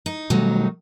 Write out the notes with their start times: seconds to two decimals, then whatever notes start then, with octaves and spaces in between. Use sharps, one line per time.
0.06 D#4
0.30 B2 D#3 F#3 G3 A3 D#4